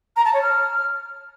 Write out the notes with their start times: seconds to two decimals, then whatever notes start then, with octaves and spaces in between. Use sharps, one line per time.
0.16 A#5
0.25 A5
0.33 C#5
0.42 F6